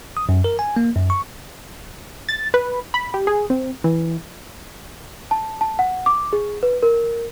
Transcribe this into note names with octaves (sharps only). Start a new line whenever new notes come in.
D#6
F#2
A#4
G#5
A#3
F#2
C#6
A6
B4
B5
G4
G#4
C4
E3
A5
A5
F#5
D6
G#4
B4
A#4